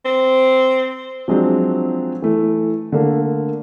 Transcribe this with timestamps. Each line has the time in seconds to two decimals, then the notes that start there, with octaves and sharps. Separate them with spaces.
0.05 C4
1.28 F3 F#3 G#3 C4 D4
2.22 E3 A3
2.92 D3 A3 A#3